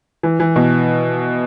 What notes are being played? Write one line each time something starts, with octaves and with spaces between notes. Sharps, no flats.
E3
E3
B2